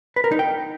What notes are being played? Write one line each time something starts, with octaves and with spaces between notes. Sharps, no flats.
B4
A#4
D#4
G5